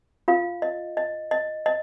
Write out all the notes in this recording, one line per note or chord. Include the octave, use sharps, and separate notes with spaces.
F4 F5
D#5
D#5
D#5
D#5